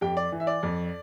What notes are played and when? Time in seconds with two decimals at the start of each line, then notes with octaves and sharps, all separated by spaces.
0.01 F2 G4 G5
0.17 D5
0.32 E3
0.40 E5
0.47 D5
0.63 F2